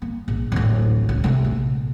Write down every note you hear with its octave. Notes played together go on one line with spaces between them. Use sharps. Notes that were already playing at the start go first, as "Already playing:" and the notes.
A#3
A#1
D1 A1
C#2
C3 A3
A#1